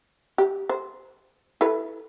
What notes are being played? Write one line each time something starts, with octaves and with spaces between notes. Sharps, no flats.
G4
C5
E4 A4 B4